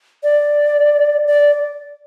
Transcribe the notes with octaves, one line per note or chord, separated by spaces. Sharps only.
D5
D5